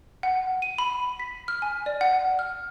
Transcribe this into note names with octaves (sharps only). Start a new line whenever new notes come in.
F#5
D#7
B5
B6
F6
G#5
D5
F#5
F6